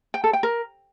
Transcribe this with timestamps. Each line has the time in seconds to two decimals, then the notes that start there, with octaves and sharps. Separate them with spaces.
0.14 G5
0.24 A4
0.33 G5
0.43 A#4